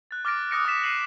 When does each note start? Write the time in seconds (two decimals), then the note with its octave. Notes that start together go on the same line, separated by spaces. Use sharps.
0.11 F#6 A6
0.25 D6 F6 A6 A#6 D7
0.51 D#6 F#6 A#6 C#7 D7
0.65 D6 F6 A6 B6 E7
0.83 F6 C7 D#7 E7 F#7